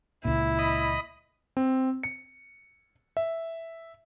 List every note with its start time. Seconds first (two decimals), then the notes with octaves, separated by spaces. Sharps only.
0.25 C#2 A#2 E4
0.59 D#5 B5
1.57 C4
2.03 C#7
3.17 E5